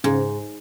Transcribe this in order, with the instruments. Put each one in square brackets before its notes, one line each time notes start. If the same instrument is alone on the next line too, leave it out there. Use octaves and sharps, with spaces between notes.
[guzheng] G#2 [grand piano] C#3